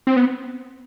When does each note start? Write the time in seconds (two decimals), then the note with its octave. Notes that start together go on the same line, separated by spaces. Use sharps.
0.07 C4
0.16 B3